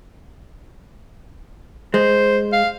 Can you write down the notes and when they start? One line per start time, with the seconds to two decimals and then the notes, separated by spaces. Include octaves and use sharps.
1.94 G#3 C5
2.52 F5